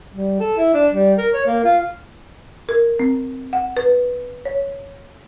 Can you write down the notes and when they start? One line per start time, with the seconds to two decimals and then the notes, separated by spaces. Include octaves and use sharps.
0.12 G3
0.40 A4
0.57 E4
0.74 D4
0.92 G3
1.18 A#4
1.34 C#5
1.46 A#3
1.64 F4
2.69 A#4
2.99 C4
3.53 F#5
3.77 B4
4.45 C#5